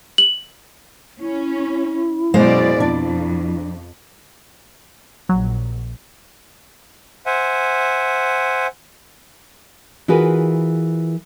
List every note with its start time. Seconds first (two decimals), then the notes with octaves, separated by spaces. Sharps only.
0.18 F#7
1.21 C#4 E4
2.34 F#2 B2 G#3 C5 D5 F5
2.80 F2 D4
5.29 A#1 F#3
7.26 C5 E5 F#5 G#5
10.08 E3 F4 F#4 G#4 A#4 B4